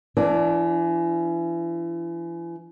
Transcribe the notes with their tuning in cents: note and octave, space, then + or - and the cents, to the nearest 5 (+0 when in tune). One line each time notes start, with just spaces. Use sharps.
E3 +35 D4 -5